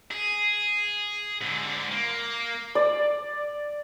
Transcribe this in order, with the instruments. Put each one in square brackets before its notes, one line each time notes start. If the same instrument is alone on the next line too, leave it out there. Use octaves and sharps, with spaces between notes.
[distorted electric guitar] G#4
G#2 D3
A#3
[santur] D5